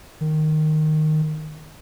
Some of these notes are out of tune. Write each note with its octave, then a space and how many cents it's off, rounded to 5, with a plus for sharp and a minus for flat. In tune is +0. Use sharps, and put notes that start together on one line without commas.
D#3 -10